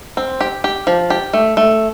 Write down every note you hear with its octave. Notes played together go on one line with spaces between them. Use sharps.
C4
G4
G4
F3
G4
A3
A3